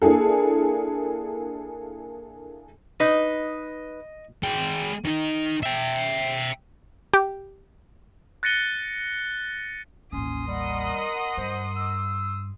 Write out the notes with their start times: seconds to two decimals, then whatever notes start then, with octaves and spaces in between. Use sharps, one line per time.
0.02 A#3 D4 E4 G#4 A4
3.00 D#4 B4 D#5
4.43 G#3 G5
5.05 D#3 D#4
5.63 E5 G5
7.14 G4
8.43 F#6 A6 A#6 C#7 D#7 G7
10.12 A1 D#2 C#4 C6 D#6
10.47 G3 A#4 D#5 F#5
11.37 G2 C5
11.76 E6